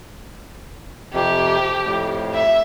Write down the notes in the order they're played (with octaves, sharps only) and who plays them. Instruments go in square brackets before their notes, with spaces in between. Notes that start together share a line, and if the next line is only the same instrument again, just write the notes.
[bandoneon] F2 C3 [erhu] G4
[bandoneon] F2 A2
[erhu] E5